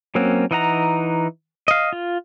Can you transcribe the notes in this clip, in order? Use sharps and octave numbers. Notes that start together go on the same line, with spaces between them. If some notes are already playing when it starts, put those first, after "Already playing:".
F#3 A#3 C4 C#4 F#4
E3 D#4 F#5 A#5
D#5 F5
F4